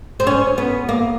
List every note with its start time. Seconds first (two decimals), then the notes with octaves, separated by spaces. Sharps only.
0.20 C4
0.27 C#4
0.58 B3
0.89 A#3